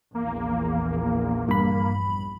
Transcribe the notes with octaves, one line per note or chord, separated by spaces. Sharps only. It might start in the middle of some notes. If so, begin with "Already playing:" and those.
A#1 E2 A#3
G2 B5